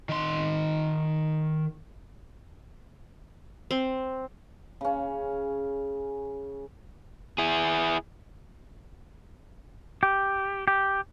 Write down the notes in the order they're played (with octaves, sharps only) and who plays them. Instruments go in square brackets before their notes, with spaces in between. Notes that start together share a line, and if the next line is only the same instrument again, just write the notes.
[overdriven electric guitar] D#3 C6
[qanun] C4
[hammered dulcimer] C#3 C#4
[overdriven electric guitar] E4 G#4
[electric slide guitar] G4
G4